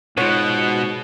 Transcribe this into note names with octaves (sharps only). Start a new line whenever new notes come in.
G#2 B2 F4 C#5 F#5